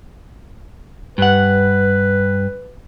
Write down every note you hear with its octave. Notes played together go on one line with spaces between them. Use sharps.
G2 B4 F#5